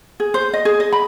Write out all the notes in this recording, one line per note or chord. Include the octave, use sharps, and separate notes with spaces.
G#4
C5
D#5
G#4
D#5
B5